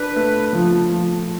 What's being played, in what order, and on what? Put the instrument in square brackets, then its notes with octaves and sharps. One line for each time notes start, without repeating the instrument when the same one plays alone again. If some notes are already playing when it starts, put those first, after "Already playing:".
Already playing: [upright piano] D4 [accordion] B4
[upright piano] A3
F3
F3